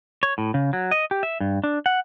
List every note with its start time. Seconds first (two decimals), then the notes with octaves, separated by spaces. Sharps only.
0.23 C#5
0.38 A2
0.54 C#3
0.73 F#3
0.91 D#5
1.11 G4
1.23 E5
1.40 G2
1.64 D4
1.86 F#5